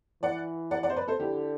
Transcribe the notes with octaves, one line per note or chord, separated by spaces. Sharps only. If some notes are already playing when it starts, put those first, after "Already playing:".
E3 D5 F#5
D5 F#5
D5 F#5
C5
B4 D5
A4 C5
D3 E4 G4